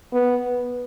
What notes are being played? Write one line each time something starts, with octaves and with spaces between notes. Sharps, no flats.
B3